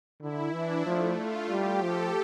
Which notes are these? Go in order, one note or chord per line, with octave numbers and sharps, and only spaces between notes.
D3 E4
E3 D4
F3 A3
F4
G3 G4
F3 A4